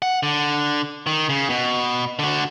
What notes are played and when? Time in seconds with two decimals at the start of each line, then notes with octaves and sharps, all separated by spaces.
0.02 F#5
0.23 D3
1.07 D#3
1.29 C#3
1.50 B2
2.19 D3 F#4